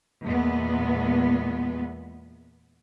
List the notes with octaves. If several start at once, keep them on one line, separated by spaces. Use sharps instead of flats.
E2 A#2 G#3 B3